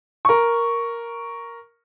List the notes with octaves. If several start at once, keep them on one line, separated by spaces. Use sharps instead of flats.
A#4 C#6